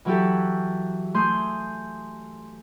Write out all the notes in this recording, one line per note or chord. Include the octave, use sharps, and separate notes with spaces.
E3 F#3 E4 F#4 G4 A4
A3 G#4 C6 D#6 G6